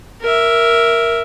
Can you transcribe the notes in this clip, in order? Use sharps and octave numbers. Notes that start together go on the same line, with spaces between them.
A#4 E5